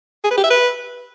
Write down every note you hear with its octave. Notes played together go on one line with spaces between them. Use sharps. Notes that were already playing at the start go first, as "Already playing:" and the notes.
G#4
B4
G4
E5
B4